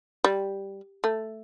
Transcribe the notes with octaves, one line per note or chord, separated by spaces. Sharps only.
G3
A3